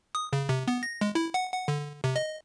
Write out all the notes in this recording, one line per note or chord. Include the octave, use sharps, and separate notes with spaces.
D#6
C#3
C3
B3
A#6
G#3
E4
F#5
F#5
D3
C3
D#5